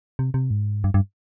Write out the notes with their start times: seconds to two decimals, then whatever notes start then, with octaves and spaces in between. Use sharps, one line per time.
0.19 C3
0.34 C3
0.51 G#2
0.84 G2
0.94 G2